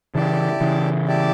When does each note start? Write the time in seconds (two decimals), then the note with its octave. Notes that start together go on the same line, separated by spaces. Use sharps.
0.15 C#3 E3 E4 G4 D5 A5
0.61 C#3 E3
1.08 E4 G4 D5 A5